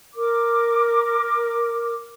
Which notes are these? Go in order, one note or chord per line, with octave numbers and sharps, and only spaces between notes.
A#4 D6